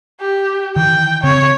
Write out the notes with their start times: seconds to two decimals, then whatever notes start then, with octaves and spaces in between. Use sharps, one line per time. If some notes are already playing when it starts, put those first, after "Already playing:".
0.21 G4
0.76 D#3 E3 G5
1.24 C#3 C4 C#5